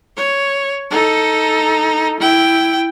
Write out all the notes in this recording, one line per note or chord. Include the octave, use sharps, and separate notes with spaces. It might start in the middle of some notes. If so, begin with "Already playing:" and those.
C#5
D#4 A4
E4 G5